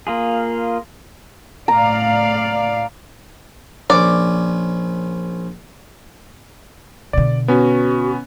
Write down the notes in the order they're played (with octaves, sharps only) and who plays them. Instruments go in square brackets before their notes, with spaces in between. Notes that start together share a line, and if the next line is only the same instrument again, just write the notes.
[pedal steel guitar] A#3 F4 G#4
[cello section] A2 D5 F5 [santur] A#5
[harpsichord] A#1 C#4 [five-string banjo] D5
[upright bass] B2 D3 [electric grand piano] D5
[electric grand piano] B3 C#4 [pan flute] F#4